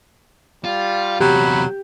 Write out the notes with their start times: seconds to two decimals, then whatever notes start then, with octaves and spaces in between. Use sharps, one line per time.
0.64 G3 F4
1.20 E2 C3 F#3 G4 B5